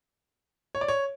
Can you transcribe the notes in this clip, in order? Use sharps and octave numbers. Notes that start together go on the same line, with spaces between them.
C#5
D5
C#5